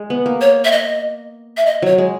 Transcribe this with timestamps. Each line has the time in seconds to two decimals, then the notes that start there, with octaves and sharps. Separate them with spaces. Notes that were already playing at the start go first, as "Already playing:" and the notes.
Already playing: G#3
0.10 B3
0.26 A#3
0.41 C#5
0.65 E5
0.72 D#5
1.57 E5
1.66 D#5
1.82 F#3 C#5
1.98 G#3